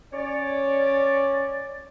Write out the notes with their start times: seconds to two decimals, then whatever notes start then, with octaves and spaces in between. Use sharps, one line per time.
0.13 C#4 C#5 D5